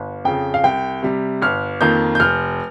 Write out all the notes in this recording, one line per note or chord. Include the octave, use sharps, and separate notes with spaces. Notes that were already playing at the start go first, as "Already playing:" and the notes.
Already playing: G1
F2 C#3 G5
F5
C2 G5
C3 G3
G1 F6
F2 D#3 A#3 G6
G6
F1 F6